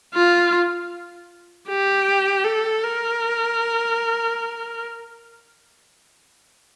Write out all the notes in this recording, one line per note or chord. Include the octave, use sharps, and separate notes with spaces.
F4
G4
A4
A#4